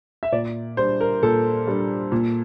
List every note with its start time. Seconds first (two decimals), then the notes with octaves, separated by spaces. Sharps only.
0.23 E5
0.32 A#2 D5
0.77 G3 D4 C5
1.01 A#4
1.22 A#2 A4
1.67 G3 D4
2.12 A#2